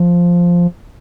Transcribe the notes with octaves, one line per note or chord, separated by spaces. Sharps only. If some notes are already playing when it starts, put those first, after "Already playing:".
Already playing: F3